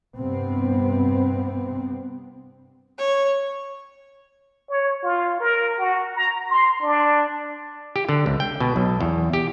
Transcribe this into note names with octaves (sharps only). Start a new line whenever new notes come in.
G2 C3 B3 C4
C#5
C#5
F4
A#4
F#4
A#5
C6
D4
G4
D3
C#2
G5
B2
B1
E2
G4